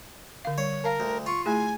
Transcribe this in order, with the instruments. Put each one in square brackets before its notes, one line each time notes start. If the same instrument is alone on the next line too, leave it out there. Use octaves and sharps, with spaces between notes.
[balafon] D3 F5
[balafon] G3 [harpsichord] C#5
[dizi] A#4 [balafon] F5 A5
[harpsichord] D2
[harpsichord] F4 [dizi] C#6
[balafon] A3 E4 G#4 [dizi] G#5